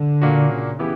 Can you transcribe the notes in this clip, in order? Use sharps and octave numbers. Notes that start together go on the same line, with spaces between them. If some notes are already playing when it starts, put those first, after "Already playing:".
Already playing: D3
A#2 A#3 D4 F#4
C#3
C#3 E3 B3 E4 G4